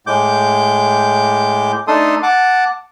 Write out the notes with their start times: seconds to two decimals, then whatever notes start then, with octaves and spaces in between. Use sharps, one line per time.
0.07 A2 G#3 D6 G6
1.88 A3 D4 D#4 A4 C6 D#6
2.23 F#5 A5 D6